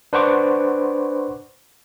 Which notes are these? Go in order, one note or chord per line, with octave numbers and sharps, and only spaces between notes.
D4 B4 C5 F#5 C#6 D6